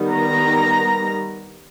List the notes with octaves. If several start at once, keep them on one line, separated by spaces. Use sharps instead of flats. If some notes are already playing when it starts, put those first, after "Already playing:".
Already playing: D#3 G3 B3
A#5